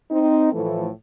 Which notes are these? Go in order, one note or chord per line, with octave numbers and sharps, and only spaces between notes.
C4 D#4
A2 E3 F3 A3